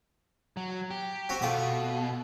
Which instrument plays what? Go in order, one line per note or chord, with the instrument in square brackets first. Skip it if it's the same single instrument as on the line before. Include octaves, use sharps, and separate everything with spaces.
[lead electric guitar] F#3
G4
[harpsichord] C4 F#4
[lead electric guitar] B2 [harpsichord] A3 F4 D6